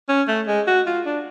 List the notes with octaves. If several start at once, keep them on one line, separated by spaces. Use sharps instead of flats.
C#4
A3
G#3
F#4
F4
D4